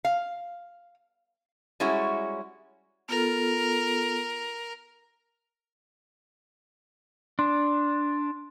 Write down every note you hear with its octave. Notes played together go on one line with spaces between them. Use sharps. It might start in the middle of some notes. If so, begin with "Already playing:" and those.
F5
G3 G#3 C#4 E4 F#4
B3 F4 A4 A#4
D4 C6